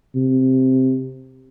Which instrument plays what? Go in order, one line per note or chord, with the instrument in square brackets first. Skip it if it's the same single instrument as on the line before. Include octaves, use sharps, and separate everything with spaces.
[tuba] C3